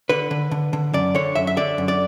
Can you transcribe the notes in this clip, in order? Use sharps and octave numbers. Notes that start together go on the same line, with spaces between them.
D3 B4
D3
D3
D3
F#2 D5
D3 C#5
F#2 E5
E5
D3 D5
F#2
D5